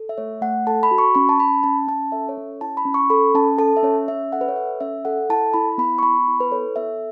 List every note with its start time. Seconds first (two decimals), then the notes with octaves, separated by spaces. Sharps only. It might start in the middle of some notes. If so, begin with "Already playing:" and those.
Already playing: A4
0.09 E5
0.18 A3 C#5
0.41 A3 F#5
0.67 A4 A5
0.83 B5
0.91 F#4
0.98 C#6
1.15 C#4 B5
1.29 A5
1.39 C#4 B5
1.63 C#4 A5
1.88 C#4 A5
2.12 A4 E5
2.29 C#5
2.37 C#4
2.61 E4 A5
2.77 B5
2.85 C#4
2.94 C#6
3.10 A4 B5
3.34 C#4 A5
3.58 A4 A5
3.77 E5
3.83 C#4 C#5
4.08 C#4 E5
4.32 A4 F#5
4.41 B4
4.49 C#5
4.56 A4 E5
4.80 C#4 E5
5.05 A4 F#5
5.29 E4 A5
5.54 E4 B5
5.78 B3 B5
5.99 C#6
6.03 B3 B5
6.27 E4
6.40 B4
6.51 A4 C#5
6.76 B3 E5